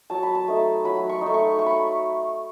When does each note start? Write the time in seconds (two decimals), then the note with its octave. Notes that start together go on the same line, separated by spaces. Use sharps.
0.10 F#3 A5
0.23 B5
0.35 A5
0.48 A3 D#4
0.85 F#3 B5
1.09 C#6
1.21 D#4
1.26 A3
1.34 C#6
1.58 A3 C#6
1.66 B5